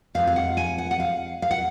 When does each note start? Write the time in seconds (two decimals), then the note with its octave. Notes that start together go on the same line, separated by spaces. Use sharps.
0.14 F2 F3 G#3 F5
0.27 F5
0.36 F#5
0.57 G#5
0.78 F#5
0.91 F#5
1.00 F5
1.42 F5
1.51 F#5